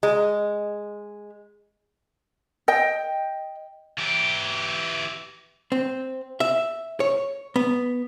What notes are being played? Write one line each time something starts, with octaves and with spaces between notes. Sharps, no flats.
G#3
D#5 G5
E3 G4
C4
E5
C#5
B3